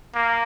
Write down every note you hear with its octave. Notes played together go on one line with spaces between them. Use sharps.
A#3